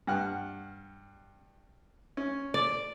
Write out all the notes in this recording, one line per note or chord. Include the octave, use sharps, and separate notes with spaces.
G2 F#5 F6
C#4
D5